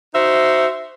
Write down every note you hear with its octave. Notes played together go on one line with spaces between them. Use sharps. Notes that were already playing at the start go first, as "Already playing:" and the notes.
D#4 F#4 C5 E5